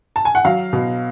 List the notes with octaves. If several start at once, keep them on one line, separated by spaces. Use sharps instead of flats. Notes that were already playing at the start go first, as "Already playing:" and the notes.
A5
G#5
F#5
F#3 F5
B2